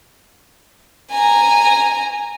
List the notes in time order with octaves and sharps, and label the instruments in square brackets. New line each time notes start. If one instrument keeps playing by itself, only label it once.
[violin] G#5 A#5